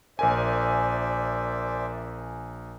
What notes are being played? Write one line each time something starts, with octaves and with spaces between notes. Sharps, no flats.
A#1 A#4 C5 D5 E5 G#5